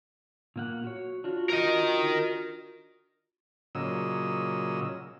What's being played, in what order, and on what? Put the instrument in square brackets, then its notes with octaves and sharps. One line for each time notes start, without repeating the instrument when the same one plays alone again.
[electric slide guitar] A#2 A#3 F#5
F#4 C#5
D4 F4 F#4
[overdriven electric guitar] A#4 D#5
[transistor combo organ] A#2 C#3 F#3 D#5 E6